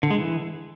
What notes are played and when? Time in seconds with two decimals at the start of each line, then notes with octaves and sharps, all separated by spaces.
0.03 D3
0.11 G#3
0.18 E3